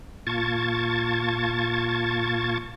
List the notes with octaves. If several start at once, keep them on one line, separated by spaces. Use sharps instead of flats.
A#2 F4 A5 C#6 G#6 A6